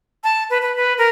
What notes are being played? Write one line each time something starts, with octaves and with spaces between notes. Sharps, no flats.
A5
B4
B4
B4
A#4